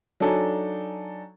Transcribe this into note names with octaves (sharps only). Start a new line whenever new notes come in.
F#3 D4 D#4 A4 G#5